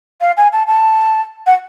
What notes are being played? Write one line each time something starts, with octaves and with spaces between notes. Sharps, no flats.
F5
G#5
A5
A5
F#5